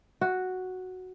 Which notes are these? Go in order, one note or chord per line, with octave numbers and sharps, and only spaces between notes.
F#4